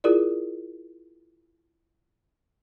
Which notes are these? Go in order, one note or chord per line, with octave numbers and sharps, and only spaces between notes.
E4 F4 G#4 A#4 D5